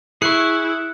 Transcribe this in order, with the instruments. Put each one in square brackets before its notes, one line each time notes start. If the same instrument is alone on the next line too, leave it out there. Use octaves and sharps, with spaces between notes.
[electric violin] E4 [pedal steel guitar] G#4 C#6 [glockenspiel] F#6 C#7